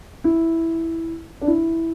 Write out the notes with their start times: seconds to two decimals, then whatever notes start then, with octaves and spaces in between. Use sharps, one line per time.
0.24 E4
1.42 D4
1.47 E4